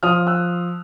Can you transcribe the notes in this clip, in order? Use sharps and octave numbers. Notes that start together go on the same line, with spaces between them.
F3 D#6 F6
E6 F#6